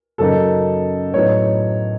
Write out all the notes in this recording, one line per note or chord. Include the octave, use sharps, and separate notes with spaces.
F#2 C#3 F#3 A#3 D#4 A4
A2 F#3 B3 D#4 C#5